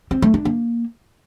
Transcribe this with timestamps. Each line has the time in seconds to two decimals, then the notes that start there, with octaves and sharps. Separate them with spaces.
0.11 C4
0.22 A3
0.34 D4
0.45 A#3